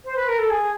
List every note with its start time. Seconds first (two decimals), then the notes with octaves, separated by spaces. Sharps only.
0.05 C5
0.16 B4
0.28 A#4
0.39 A4
0.50 G#4